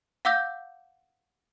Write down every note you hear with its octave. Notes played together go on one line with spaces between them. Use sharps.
F5 F#5 D6 E6 G6 A#6